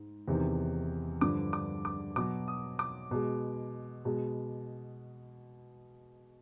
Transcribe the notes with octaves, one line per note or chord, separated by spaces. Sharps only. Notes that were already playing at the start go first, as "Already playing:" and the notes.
Already playing: G#2
E2 C3 D#3
G2 D3 F3 D6
D6
D6
B2 F#3 D6
D#6
D6
B2 G#3
B2 G#3